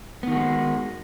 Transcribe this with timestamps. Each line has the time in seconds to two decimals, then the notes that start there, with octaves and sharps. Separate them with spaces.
0.23 B3
0.28 D#3
0.32 F#4
0.36 G#3